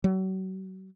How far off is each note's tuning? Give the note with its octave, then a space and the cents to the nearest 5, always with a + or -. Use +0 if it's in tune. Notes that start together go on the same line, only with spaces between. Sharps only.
F#3 +35